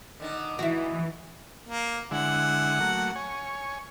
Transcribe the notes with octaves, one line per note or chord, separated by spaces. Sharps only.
D3 D#3 D#4
E3 E4 F#4
A#3
D3 G#3 E4 F#5
F#3 A3 A#3
C#5 G#5